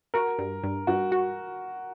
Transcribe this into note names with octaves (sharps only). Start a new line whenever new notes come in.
F#4 A#4
G2
G2
G2 F#4
F#4